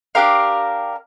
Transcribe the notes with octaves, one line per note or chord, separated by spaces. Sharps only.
D4 G4 A#4 F5